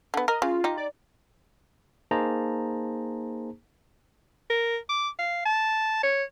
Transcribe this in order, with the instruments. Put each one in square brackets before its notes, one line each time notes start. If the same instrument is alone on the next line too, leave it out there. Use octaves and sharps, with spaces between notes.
[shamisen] D3 B3
[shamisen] A#4 [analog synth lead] D#5
[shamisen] C#3 [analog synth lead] F4
[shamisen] D#4 G4
[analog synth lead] D5
[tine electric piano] A#3 D#4 G#4 C5 A5 A#5
[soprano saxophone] A#4
D6
F5
A5
C#5